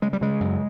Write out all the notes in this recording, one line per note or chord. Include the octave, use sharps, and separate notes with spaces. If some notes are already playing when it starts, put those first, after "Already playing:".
C#3 G#3
G3
C#3 G#3
F#2